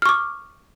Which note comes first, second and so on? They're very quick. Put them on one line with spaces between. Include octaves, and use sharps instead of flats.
F6 C#6 D6